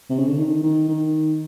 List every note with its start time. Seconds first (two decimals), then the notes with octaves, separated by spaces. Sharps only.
0.10 C3
0.19 C#3
0.28 D3
0.38 D#3
0.63 D#3
0.89 D#3